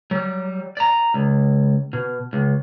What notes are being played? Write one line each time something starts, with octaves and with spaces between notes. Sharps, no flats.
F#3 G3
D5 A#5
C#2
B2
C#2